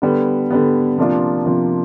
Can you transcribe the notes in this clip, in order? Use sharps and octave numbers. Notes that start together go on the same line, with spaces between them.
D3 G3 B3
D3 G3 B3
C3 F3 A#3 D4 F4
C3 F3 A#3 D4 F4